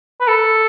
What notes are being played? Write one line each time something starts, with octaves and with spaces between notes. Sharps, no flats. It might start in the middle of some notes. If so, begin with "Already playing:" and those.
B4
A4